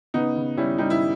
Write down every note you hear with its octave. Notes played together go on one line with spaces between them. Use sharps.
C#3 B3 D#4
C#3
G3 C#4 E4
G3 D#4
E4